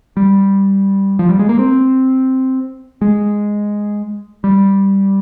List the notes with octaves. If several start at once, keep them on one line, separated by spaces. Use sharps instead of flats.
G3
F3
G3
G#3
A#3
C4
G#3
G3